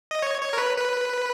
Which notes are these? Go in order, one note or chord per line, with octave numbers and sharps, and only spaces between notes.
D#5
C#5
C#5
A#4
B4
B4